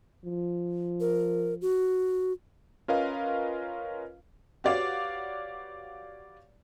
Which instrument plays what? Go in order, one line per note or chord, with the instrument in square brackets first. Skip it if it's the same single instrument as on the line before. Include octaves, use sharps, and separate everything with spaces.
[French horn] F3
[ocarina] A#4
F#4
[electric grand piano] C#4 F4 A#4 B4 D#5 F5
[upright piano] F#4 G4 B4 C#5 D5 F5